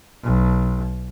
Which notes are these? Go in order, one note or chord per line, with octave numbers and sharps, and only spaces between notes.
B1